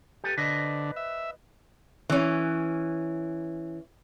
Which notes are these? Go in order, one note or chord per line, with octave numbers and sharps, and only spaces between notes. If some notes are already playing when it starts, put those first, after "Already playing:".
G4 A4 B4
D3 B4 C5 D#5
E5
E3 C#4